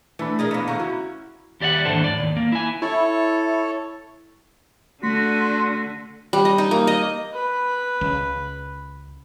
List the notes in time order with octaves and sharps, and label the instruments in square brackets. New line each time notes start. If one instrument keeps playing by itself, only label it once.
[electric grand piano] E3 D4 B5 [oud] A3
[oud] G#4 A#4 D#5
A#3 B3
[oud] D3 E3 [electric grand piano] F5 A#5 C#6
[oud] C#4 [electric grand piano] E4 F#4
[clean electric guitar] D#2 G4 D5 E5 F#5
D#2 G#2 D3 E3 A4 C5
A2 D5
D#2
A#3
E4 G#5
[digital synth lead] E4 [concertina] A4 C#5
[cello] D3 [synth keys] A3 B6 [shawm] F#4 [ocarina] C6
[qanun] G3
D#5
D#4
A#3
D#5
[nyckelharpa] B4
[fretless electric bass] C#2